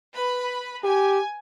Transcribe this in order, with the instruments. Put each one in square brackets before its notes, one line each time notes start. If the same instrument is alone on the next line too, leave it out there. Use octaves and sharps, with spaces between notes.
[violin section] B4 B5
[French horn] G4 [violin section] G#5